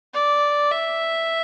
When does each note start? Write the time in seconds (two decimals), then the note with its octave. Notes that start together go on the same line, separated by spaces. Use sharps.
0.14 D5
0.72 E5